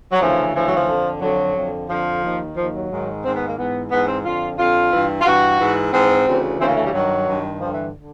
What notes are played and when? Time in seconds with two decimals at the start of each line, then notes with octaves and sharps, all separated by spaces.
0.12 F#3
0.20 D2 C#3 E3 F3
0.54 D2 C#3 E3 F3
0.69 F#3
0.77 F3
0.88 F2 D3
1.21 F2 D3 F#3
1.56 F2 D3
1.89 F2 D3 F3
2.22 D#2 D#3
2.56 D#2 D#3 F3
2.74 F#3
2.90 G#2 D#3
3.24 G#2 D#3 C4
3.35 B3
3.46 A#3
3.57 G#2 E3 B3
3.90 G#2 E3 B3
4.07 C4
4.24 F2 D3 F4
4.59 F2 D3 F4
4.91 G2 E3
5.21 F4
5.25 G2 E3 F#4
5.59 G#2 E3
5.93 G#2 E3 C4
6.27 D2 C#3 E3
6.59 D2 C#3 E3 C4
6.68 A#3
6.77 A3
6.85 G3
6.93 G2 D#3 F#3
7.28 G2 D#3
7.61 G2 D3 F3
7.74 E3
7.96 D3